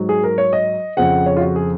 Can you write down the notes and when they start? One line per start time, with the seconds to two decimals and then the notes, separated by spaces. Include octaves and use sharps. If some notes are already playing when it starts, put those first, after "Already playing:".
Already playing: G#2 F#3
0.09 G#4
0.24 A#4
0.38 C#5
0.53 D#5
0.97 F2 C#3 F3 F#5
1.26 C#5
1.37 F4
1.41 F#4
1.56 G#4